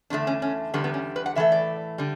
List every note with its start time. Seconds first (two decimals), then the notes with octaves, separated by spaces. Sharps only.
0.10 E2 D3 A3 D4
0.27 C#4
0.42 C#4
0.74 E2 D3 G3 B3
0.84 B3
0.94 C#4
1.16 B4
1.26 F#5
1.36 A2 E3 A3 E5
1.52 D5
1.98 D3 G3